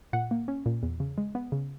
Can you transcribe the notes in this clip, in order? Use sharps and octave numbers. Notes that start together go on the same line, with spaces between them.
A#2 F#5
A#3
C#4
A#2
E2
C#3
G#3
B3
C#3